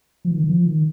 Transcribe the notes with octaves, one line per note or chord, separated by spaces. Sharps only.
F3
D#3
D#3
F3
D#3